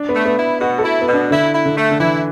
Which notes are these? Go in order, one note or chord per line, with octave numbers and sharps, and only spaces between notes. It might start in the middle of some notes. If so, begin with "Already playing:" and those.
Already playing: D4
B3
A3
B3
E4
B2 F#4
A4
E4
B3
B2
D4
D3 E4
E4
D3
A3
D3
E3 E4